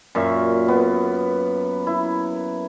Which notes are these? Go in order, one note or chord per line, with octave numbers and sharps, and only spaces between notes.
F#2 A#2 E5
B3
E4